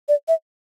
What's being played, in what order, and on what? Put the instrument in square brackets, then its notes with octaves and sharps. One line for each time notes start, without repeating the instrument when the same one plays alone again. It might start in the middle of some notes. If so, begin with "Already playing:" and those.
[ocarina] D5
E5